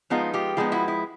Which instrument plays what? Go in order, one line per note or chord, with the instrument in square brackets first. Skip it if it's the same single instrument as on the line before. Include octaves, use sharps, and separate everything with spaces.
[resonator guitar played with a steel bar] F3 G#3 B3 D#4 F4
F4 G4
F3 G#3 B3 D#4 F4
E4 F#4
E4